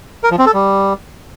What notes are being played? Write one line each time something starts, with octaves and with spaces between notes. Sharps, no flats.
A#4
F3
C4
A4
G3